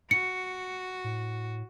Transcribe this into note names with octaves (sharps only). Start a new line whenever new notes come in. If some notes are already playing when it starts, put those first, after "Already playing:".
F#4 C#7
A2